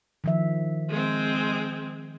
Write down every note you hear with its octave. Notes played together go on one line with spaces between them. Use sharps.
D#3 F3 E5
G#3 C4